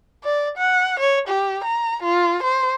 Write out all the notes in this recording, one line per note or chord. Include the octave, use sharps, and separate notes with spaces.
D5
F#5
C#5
G4
A#5
F4
C5